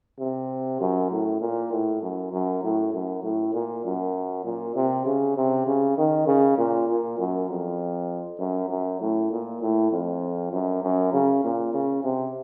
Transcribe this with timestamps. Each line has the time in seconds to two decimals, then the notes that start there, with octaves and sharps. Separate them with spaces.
0.20 C3
0.81 F#2
1.12 A2
1.41 A#2
1.72 A2
2.02 F#2
2.32 F#2
2.63 A2
2.93 F#2
3.23 A2
3.54 A#2
3.84 F#2
4.45 A#2
4.75 C3
5.06 C#3
5.37 C3
5.67 C#3
5.98 D#3
6.27 C#3
6.58 A#2
6.88 A#2
7.19 F#2
7.49 F2
8.40 F#2
8.70 F#2
9.01 A2
9.31 A#2
9.61 A2
9.92 F2
10.53 F#2
10.83 F#2
11.13 C#3
11.44 A#2
11.74 C#3
12.04 C3